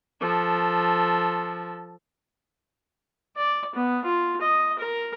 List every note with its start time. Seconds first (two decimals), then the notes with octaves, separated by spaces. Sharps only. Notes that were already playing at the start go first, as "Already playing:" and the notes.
0.21 F3 A4
3.36 D5
3.75 B3
4.05 F4
4.41 D#5
4.79 A#4